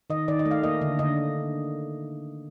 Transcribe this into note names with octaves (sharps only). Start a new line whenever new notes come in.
D#3 D#5
D#3 D5
D#5
A3
F5
A#3 D#5
D3
D3 D#5